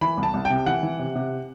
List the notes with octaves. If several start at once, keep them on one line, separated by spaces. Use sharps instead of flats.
E3 B5
C2
A5
C2
G5
C3
E3 F#5
E3
C3
C3